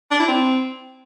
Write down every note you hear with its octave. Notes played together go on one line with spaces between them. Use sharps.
D4
E4
C4